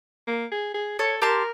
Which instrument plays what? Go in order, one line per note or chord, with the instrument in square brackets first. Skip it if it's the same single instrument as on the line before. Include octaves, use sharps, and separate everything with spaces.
[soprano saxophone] A#3
G#4
G#4
[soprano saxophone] A4 [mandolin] C#5
[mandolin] G4 A5 C6 [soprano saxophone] A#4